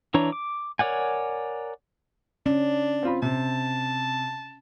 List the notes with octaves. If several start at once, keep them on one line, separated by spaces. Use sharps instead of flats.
E3 D4 C#5 A#5
D6
A#4 C#5 D5 F#5 G#5
C#4 D4
C4 F4 B5
C3 A5